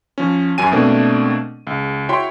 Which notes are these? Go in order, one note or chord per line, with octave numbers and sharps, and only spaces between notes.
F3 C#4
F#2 F#3 G#5 D#7
B2 A3 A#3 C4 D4
C#2
E4 F#4 C#5 G5 B5 C6